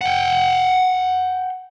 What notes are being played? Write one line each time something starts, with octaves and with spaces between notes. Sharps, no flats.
F#5 G5